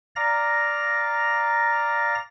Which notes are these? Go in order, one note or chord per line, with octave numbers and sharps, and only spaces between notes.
D5 F5 A#5 A#6